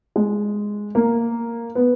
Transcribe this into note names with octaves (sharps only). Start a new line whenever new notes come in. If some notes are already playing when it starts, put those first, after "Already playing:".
G#3
A#3
B3